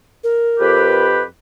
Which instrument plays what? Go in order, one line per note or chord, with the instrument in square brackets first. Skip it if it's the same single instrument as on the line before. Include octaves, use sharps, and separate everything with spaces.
[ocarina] A#4
[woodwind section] F2 G4 B4